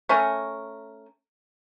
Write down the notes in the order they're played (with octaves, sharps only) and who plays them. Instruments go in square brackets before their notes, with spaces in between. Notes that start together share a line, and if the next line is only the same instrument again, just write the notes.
[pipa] A3 C#4 A#4